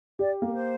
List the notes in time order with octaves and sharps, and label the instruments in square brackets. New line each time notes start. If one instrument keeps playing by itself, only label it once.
[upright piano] G4 [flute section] D5
[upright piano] A#3 [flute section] A#4
[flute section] C5